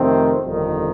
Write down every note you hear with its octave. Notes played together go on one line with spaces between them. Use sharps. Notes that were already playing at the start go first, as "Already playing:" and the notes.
Already playing: F2 C3 D#3 A3 C4
G1 F2 D#3